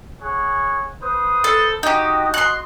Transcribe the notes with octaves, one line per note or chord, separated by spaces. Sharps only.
G#4 C#5 F#5
B4 C5 D#6
A4
D#4 F#4 G4 D#5
C6 F#6